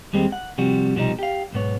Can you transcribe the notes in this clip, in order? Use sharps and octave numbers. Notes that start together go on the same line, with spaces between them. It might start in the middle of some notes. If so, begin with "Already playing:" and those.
D#2 G3 G#3 C4
F#5
C3 F3 G3 F#4
C2 B2 F3 G3 D#4
G4 F5
B1 G#2 B3 C#5